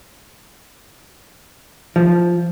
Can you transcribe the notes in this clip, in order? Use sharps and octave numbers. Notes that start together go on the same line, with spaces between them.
F3